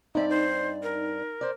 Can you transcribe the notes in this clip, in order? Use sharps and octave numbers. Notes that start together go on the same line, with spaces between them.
G2 C4 D#4 D5 E5
C5
A#4
C5 D5